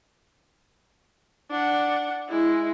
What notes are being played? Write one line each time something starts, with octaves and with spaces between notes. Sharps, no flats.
D4 F#5
G#3 E4